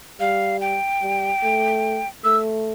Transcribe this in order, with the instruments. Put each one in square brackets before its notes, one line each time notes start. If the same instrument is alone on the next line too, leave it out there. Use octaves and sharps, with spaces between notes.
[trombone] G3 [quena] F5
[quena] G5
[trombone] G3
A3
[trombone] A3 [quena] E6